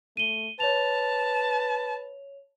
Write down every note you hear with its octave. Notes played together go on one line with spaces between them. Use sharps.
A3 D#7 G7
B4 C#5 A5 F7